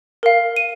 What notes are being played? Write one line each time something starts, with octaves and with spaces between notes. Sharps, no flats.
A#4 F5
D#7